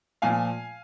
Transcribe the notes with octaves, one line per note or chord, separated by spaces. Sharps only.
A#2 F3 F5 G#5